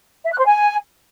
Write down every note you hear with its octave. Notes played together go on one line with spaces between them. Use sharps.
E5
F#6
C5
G#5